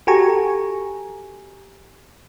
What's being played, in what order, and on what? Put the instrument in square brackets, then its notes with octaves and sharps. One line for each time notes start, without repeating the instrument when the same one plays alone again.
[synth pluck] F#4 G4 A4 G#5 A#5 C#6